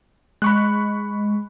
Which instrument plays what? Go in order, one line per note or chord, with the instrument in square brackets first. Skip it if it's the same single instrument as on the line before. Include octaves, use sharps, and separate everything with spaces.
[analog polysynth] G#3 [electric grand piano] B5 C#6 F#6